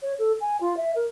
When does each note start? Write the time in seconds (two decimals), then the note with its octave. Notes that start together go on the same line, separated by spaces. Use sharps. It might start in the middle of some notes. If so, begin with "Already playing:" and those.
0.02 C#5
0.19 A4
0.41 G#5
0.61 F4
0.77 E5
0.96 A#4